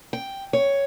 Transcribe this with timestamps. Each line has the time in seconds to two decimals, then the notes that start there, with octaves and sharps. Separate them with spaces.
0.13 G5
0.53 C#5